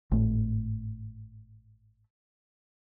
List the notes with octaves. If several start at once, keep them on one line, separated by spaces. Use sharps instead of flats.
G#1 A2 A3